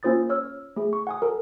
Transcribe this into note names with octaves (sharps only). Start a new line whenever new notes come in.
A#3 C#4 F4 C5 D#6 A6
C#5 E6 F6
A3 G#4
C#6
F#5 G#5 D#6
A4 A#4